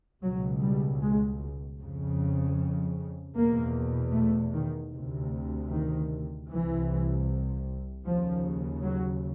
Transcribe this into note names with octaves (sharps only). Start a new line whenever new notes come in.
C#2 B2 F#3
G3
G#3
F2 C#3
E2 B2 A#3
A3
D#3
D2 C3
D#3
C2 C3 E3
D#2 C#3 F3
F#3